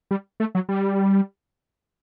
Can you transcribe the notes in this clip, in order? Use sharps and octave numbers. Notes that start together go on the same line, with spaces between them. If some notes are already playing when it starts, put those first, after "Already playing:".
G3
A3
F#3
G3